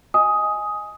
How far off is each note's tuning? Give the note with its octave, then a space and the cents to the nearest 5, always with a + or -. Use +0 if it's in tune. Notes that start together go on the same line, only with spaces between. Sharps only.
D#5 +10 G#5 +0 D#6 +10